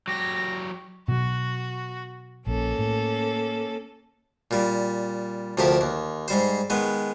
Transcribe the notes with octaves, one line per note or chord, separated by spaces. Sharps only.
F#3 G4 A#6
B2 F#3 F#4
A#1 A#3 C#4 A4
A2
A#2 G3
D2 C3 F3 G4 A#4
D#2
G#2 G3 C5
D#3 G#3 B3